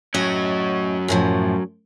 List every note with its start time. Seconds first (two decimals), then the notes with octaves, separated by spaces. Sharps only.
0.14 A2 F#3 C#4 D#5
1.08 F#2 A2 F3